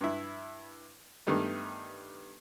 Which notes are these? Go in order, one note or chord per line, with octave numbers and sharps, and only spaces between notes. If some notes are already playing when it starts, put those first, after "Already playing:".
G2 E4
G2 D#3 G3 A3 B3